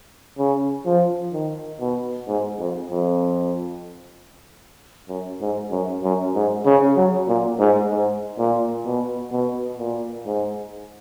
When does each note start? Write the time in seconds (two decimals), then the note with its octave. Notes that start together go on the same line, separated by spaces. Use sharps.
0.38 C#3
0.86 F3
1.33 D#3
1.80 B2
2.27 G#2
2.58 F2
2.90 F2
5.08 F#2
5.41 G#2
5.71 F#2
6.03 F#2
6.35 G#2
6.65 C#3
6.96 F#3
7.28 A#2
7.59 G#2
7.91 G#2
8.38 A#2
8.85 B2
9.32 B2
9.78 A#2
10.26 G#2